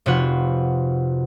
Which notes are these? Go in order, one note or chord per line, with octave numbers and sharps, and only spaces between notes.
F1 C3 F4 F#4 B4 F#5